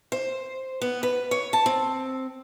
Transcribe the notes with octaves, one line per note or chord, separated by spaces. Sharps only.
C5
B3
B4
C#5
A5
C4